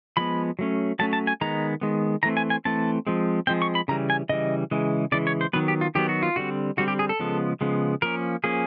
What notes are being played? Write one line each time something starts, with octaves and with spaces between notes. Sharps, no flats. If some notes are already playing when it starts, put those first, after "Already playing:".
F3 G#3 B3 B5
F#3 A3 C#4
F#3 A3 C#4 A5
A5
G#5
D#3 G#3 B3 A#5
D#3 G#3 B3
E3 A3 C4 A#5
G#5
G#5
E3 A3 C4 A5
F3 G#3 C4
F3 G#3 C4 G5
C#6
B5
C#3 E3 G3 A#5
G#5
C#3 E3 G3 D#5
C#3 E3 G#3
C#3 E3 G#3 D5
C#5
C5
D#3 F#3 B3 B4
G4
F4
D#3 F#3 B3 G4
F#4
F4
D3 G3 C4 F#4
D3 G3 C4 F#4
G4
G#4
A4
C#3 F3 G#3 B3
C#3 F3 G#3 B3
F3 A#3 C#4 A#4
F3 A#3 C#4 G#4